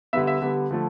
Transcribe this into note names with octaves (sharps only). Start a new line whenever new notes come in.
D3 G3 B3 E5
E5
D3 G3 B3
D3 F3 A3